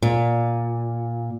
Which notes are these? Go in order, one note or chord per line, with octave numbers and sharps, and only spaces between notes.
A#2